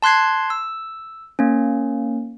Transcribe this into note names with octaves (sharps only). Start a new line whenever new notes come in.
A5 C6 F#6 G#6 C7
E6
A#3 C#4